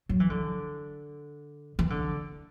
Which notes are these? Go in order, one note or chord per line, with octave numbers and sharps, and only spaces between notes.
F#3
E3
D3
E3
D3